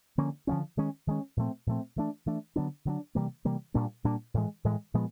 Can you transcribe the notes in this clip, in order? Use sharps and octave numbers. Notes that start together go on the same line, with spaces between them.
D3 F3 A#3 C#4
D3 F3 A#3 C#4
D#3 G#3 C#4
D#3 G#3 C#4
A#2 F3 A3 C4
A#2 F3 A3 C4
E3 A3 D4
E3 A3 D4
D3 F#3 B3 D4
D3 F#3 B3 D4
C3 E3 G3 A#3
C3 E3 G3 A#3
A#2 G3 A#3 D4
A#2 G3 A#3 D4
A2 E3 G#3
A2 E3 G#3
A#2 F3 G#3 B3